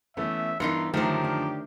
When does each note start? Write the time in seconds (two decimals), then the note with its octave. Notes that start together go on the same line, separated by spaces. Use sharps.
0.17 E3 A3 B3 C#4 E5
0.60 G2 E3 B3 D#4 A#4 C6 C#7
0.94 F#2 D3 D#3 F3 A3 G4 C5
1.24 D4